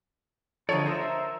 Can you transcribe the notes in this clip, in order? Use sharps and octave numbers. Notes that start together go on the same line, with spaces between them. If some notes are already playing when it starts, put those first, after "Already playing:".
D3 F3 A4 C#5 D#5 A#5
A#4 C5 E5